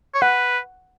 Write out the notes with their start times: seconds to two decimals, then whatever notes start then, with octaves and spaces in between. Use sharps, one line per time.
0.14 C#5
0.21 B4 F#5